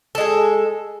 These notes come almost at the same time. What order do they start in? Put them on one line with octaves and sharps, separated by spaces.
A4 G#3 G#4